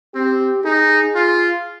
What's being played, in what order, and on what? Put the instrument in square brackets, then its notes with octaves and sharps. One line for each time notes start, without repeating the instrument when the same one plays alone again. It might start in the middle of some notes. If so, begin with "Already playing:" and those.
[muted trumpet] C4 [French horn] G4
[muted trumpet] D#4 [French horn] G#4
[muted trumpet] F4